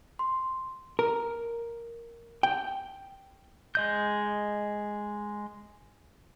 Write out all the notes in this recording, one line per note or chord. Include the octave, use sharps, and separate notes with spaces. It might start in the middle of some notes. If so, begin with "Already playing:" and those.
C6
A#4
G5
G#3 D#5 G6